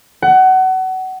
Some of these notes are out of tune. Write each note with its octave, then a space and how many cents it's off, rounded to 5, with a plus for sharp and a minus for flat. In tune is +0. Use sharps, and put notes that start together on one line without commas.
F#5 +25